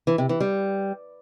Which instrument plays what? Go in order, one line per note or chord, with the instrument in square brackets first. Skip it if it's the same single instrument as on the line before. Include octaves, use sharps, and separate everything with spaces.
[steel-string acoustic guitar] E3
C3
E3
G3